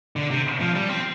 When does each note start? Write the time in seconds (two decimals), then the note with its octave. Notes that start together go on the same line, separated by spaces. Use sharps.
0.16 D3
0.31 C3
0.61 F3
0.75 G3
0.89 C4